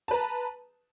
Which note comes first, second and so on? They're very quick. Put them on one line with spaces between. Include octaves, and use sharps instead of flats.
A5 B4 A#5